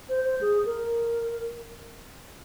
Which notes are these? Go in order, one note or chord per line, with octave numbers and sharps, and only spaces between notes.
C5
C5
G#4
A#4